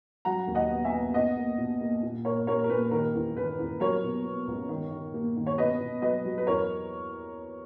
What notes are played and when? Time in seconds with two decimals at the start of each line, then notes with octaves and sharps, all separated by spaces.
0.25 F#3 F#5 A#5
0.47 D#2
0.55 D#5 F#5
0.70 B3
0.85 E5 G#5
0.93 B3
1.14 B2 D#5 F#5
1.37 A#3
1.58 B2
1.81 A#3
2.03 A#2
2.25 A#2 A#4 C#5
2.47 A#2 A#4 C#5
2.64 A#4
2.70 A#2 B4
2.91 D#3 A#4
3.14 E2
3.36 D#3 B4
3.59 E2
3.80 F#3 A#4 C#5
4.03 B2
4.25 B3
4.47 C#2
4.69 D#3
4.91 D#3
5.14 A#3
5.36 D#3
5.47 C#5
5.58 B2 B4 D#5
5.80 B2
6.02 F#3 B4 D#5
6.25 F#3
6.38 B4
6.47 E2 A#4 C#5